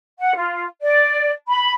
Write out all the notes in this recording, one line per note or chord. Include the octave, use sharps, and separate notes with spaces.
F#5
F4
D5
B5